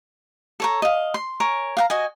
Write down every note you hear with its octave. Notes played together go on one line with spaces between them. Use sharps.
A4 C#5 A#5
D#5 F5
C6
A#4 C#5 G#5
F5 F#5 A#5
F#4 D#5 G#5